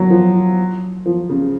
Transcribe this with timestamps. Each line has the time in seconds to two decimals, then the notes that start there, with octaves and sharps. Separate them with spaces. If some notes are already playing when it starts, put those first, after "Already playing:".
Already playing: F#3
0.10 F3
1.06 F3
1.29 C#3